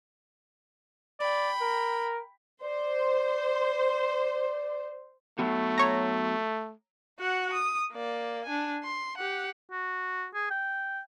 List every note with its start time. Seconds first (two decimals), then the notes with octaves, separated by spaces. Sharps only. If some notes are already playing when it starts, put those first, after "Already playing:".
1.20 D5 G5 B5
1.61 A#4
2.63 C5 D5
5.39 F#3 A3 B3 F#4
5.78 C#5 A#5
7.19 F#4 F#5
7.53 D#6
7.92 A#3 D5
8.45 D4 G#5
8.83 C6
9.18 G4 F#5
9.71 F#4
10.34 G#4
10.50 G5